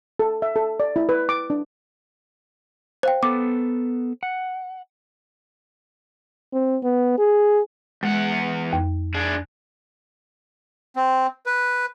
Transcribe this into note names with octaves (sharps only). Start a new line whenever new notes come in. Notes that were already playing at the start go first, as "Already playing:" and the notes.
A4
E5
A4
D5
E4
B4
D6
D4
C5 F5 G5
B3 A4 D6
F#5
C4
B3
G#4
E2 G#3 F#5
F2
D4 G#4
C4
B4